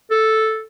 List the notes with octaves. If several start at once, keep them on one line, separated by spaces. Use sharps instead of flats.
A4